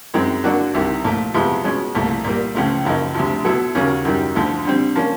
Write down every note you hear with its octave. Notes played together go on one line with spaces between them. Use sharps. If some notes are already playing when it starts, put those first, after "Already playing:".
F#2 D#3 G#3 C4
D3 F#3 A#3 D4 F#4
C2 C3 D#3
A#2 F3 A3
F2 C3 F3 G#3 B3
B2 G#3 C#4
C2 A#2 F3 A3
A#2 G3 A#3
C#2 C#3 F3 A3
F#2 C#3 F3 A#3 D#4
D2 C3 F3
B2 F#3 B3 E4 A4
D#2 C#3 F#3 A#3 C#4
F#2 D#3 G3
D2 D3 F3 A3
D3 G3 C4
F3 A#3 C#4